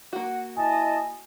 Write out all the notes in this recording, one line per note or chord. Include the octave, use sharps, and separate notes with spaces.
A#3 F#4 F#5
E4 D#5 G#5 A5